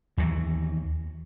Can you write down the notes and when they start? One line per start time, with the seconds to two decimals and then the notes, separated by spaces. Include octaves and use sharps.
0.17 D#2 E3 F#3